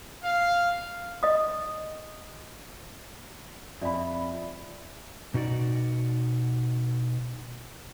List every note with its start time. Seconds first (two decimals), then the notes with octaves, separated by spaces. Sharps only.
0.24 F5
1.23 D#5 D#6
3.81 F2 D5 E5 B5
5.34 B2 D#4 F#4 C5 D5